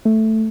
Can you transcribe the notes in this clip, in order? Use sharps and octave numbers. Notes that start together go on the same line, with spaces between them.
A3